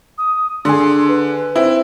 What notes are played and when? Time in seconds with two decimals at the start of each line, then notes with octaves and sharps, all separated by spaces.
0.18 D#6
0.65 D3 G#4 C6
1.08 B4
1.55 C4 E4